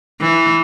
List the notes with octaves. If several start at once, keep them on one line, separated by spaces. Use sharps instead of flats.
E3